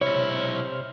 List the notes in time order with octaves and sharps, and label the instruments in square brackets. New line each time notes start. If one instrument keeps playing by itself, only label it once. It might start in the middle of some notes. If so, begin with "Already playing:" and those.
[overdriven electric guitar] B1 E4 [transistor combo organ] C3 C5 F6 [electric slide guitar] C#5